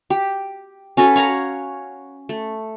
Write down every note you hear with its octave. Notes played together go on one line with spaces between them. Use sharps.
G4
C#4 F#4 A4 B4
C#5 F5 F#5 A#5
A3